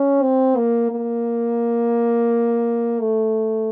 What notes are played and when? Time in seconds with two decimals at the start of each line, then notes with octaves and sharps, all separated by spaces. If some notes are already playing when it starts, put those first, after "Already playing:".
Already playing: C#4
0.22 C4
0.57 A#3
0.92 A#3
3.00 A3